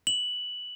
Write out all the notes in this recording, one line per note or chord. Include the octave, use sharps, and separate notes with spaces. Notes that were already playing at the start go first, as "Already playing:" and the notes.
F#7